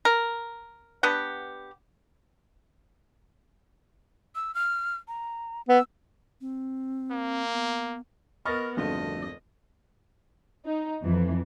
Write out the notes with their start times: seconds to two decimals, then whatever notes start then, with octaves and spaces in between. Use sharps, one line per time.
0.05 A#4
1.03 B3 D4 G4 F#5
4.35 E6
4.55 F6
5.08 A#5
5.69 B3 E6
6.41 C4
7.11 A#3
7.53 B3
8.45 B3 A#4 D#5 B5 C#6 F6 A6 A#6
8.77 G#1 F2 D3 G3 A3 D4 F#4 D#5
10.66 D#4
11.03 F2 E3